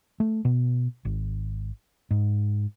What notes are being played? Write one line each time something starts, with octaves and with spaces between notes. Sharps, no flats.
A3
B2
G#1
G#2